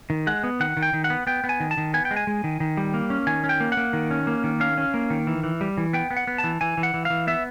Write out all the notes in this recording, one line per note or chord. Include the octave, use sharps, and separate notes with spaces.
D#3
G#3 F#5
B3
D#3 F#5
D#3
G5
D#3
F#5
B3
B3 G5
B3
G#5
D#3
A5
D#3
B3 G#5
G5
G#3
G#5
G#3
D#3
D#3
G3
A#3
C#4
D#3 G#5
C#4
G5
A#3
F#5
A#3
D#3
C#4
A#3
D#3
C#4 F5
C#4
A#3
D#3
E3
E3
G3
E3
B3 G5
B3
F#5
B3
A5
E3
E3 G#5
E3
F#5
E3
E3 F5
B3 E5